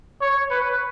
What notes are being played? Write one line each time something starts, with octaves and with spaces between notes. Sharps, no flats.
C#5
B4